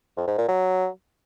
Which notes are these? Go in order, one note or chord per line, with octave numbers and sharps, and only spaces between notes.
F2
G#2
A#2
F#3